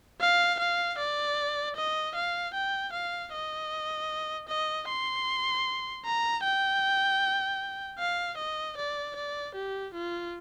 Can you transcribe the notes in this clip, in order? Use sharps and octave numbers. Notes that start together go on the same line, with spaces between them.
F5
F5
D5
D#5
F5
G5
F5
D#5
D#5
C6
A#5
G5
F5
D#5
D5
D5
G4
F4